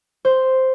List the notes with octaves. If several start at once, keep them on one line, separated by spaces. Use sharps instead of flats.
C5